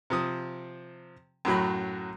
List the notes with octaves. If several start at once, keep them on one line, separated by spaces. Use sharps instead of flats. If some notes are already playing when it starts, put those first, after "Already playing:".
C3 F3 D#6
F#2 A2 F#3 B5